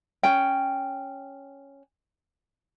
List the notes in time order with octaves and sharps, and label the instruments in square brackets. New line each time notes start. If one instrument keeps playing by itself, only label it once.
[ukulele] C#4 G5